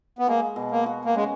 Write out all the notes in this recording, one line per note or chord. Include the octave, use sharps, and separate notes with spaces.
B3
G#3 A#3
B2
A#3
F#4
A#3
G#3 C#4